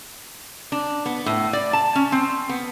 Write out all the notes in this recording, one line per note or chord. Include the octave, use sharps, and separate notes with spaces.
D4
B3
A2
D5
A5
C#4
C4
B3